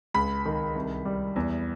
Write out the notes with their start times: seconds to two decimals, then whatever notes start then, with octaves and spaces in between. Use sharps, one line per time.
0.14 C#2 B5
0.46 D#3
0.75 C2
1.05 G3
1.36 E2